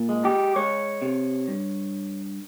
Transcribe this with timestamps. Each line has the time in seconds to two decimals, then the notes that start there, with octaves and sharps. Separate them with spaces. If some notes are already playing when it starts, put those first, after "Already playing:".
Already playing: A#2
0.09 G#3
0.25 G4
0.56 G#3 C#5
1.02 C3
1.48 G2